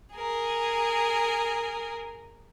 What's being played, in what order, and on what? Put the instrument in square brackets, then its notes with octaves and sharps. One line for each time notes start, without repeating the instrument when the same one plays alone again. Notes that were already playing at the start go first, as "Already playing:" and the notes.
[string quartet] G#4 A#4